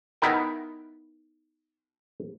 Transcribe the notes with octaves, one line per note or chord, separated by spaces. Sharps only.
B3 D#4 E4 A#4 E5 G5